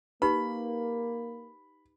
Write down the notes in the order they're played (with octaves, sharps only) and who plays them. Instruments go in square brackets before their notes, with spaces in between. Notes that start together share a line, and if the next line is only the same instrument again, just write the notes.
[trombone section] A#3 [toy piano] D#4 G4 B4 [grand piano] B5